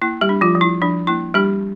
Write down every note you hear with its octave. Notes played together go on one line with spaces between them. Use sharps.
A#3 E4
G3 G4
D4
F3 F4
F3
E4
F3 D4
A#3 E4
G3 D4 G4